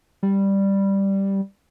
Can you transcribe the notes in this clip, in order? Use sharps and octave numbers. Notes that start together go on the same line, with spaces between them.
G3